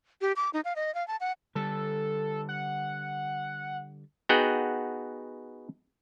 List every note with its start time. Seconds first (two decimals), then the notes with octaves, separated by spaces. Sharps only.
0.21 G4
0.36 D6
0.53 D#4
0.65 F5
0.76 D#5
0.95 F5
1.08 A5
1.20 F#5
1.55 D3 G3 A4
2.49 F#5
4.29 B3 D#4 F#4 G#4 F#5 G5